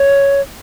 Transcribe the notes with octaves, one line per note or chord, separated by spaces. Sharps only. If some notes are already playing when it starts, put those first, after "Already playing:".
Already playing: C#5